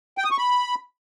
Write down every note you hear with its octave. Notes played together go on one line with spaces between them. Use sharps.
G5
D#6
C#6
B5